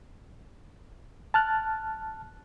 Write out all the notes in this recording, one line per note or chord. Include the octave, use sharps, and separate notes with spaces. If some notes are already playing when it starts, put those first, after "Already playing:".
A5 F6 F#6